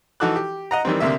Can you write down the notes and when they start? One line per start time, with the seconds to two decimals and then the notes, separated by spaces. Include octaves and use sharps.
0.20 E3 D#4 F#4 A4 D6 F#6
0.36 G4
0.71 D#5 F#5 A#5
0.85 D#3 E3 G3 C4
1.00 D2 C3 A#3 E5